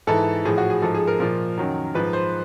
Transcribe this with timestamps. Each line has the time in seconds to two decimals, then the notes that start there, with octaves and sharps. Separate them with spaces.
0.07 G#2 E3 A4
0.45 A2 F3 G#4
0.58 F#4
0.70 G#4
0.82 G#2 F3 A4
0.94 G#4
1.07 A#4
1.19 A#2 F3 A#4
1.58 F#2 D#3 F#3
1.94 G#2 F3 B4
2.13 C5